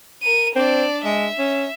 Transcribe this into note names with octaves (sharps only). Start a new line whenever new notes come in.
A#4 D#7
C4 D4 D5
G#3 E5
C#4